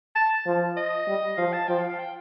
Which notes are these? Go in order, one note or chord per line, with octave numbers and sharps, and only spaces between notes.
A5
F3
D#5
G3
F3 F5
A5
F3 G5
F5
F5
G5